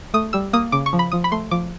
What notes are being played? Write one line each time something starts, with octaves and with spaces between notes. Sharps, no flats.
A3 D#6
G3 E6
A#3 D#6
C#3 D6
C#6
F3
B5
F3 D#6
B5
A3 C6
F3 D6